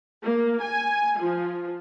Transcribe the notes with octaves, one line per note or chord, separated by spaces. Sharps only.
A#3
G#5
F3